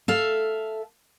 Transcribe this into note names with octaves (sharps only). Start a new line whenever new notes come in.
A4 E5 F5